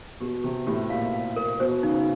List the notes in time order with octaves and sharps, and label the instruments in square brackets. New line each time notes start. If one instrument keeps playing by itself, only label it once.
[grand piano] B2 [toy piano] G4
[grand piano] C3 [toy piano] G4
[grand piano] A2 [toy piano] G4
[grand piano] A#2 [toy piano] F5
[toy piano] F5
A#4
[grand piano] B2 [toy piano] C5
[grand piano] C#3 [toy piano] D#4